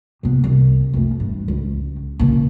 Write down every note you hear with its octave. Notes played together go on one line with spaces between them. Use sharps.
C3 B3
C2
F2 A3
G2
C#2
A#2 C#3